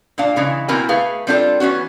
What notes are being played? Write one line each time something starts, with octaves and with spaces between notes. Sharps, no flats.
A#2 D4 F5
C#3 E3 G#3
B2 A#3 C4 E4 A#4 G#5
A3 G#4 B4 F5
G3 C4 D4 F4 A4
E3 B3 C#4 F#4